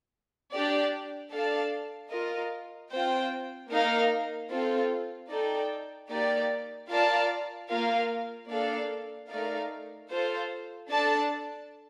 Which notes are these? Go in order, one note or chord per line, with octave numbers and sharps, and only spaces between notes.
D4 G4 D5
D4 A4 D5 F5 A5
F4 A#4 D#5
C4 F4 C5 G5
A#3 D#4 A#4 F5
C4 F4 A4
D#4 A4 D5 G5
A#3 D#4 G4 D5
F4 A#4 D5 F5 A5
A#3 F4 A#4 F5
A#3 D4 A4 D5 F5
A3 D#4 A#4 D5 F5
F4 A4 C5
D4 A4 D5 A5